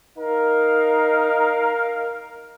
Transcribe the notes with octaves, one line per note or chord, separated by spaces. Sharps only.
D#4 A#4 F5